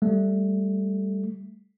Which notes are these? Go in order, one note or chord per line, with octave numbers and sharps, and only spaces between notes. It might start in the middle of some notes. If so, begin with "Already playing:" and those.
G3 A3